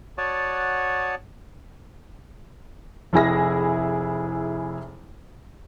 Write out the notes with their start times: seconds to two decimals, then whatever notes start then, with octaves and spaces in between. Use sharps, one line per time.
0.18 F#4 C#5 D5 F#5 A5 D#6
3.13 F1 E4 G#4 A#6